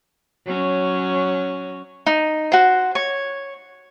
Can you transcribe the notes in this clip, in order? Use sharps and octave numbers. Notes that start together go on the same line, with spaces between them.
F#3 C#4
D#4
F#4 C5
C#5